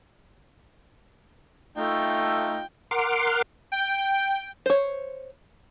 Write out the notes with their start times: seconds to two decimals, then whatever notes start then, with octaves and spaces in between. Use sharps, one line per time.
1.78 A3 D#4 F4 G5
2.91 A#4 F#5 C6 D6 F6
3.72 G5
4.66 C5 C#5